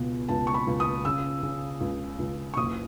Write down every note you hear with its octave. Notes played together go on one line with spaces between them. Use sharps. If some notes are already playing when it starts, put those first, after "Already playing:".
Already playing: C#2 B2
C#2 A5
C#6
B5
C#2
D#6
C#3 E6
C#3
C#2
C#2
C#6
F#1 D#6